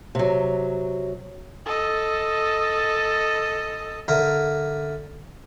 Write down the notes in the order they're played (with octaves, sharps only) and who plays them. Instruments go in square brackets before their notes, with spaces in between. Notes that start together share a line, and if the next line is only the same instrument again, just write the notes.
[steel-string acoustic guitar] C3 F#3
[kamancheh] A4 D#5
[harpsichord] D3 A#4 E5